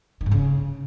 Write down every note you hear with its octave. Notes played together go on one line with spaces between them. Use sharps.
D#3
G#2
C#3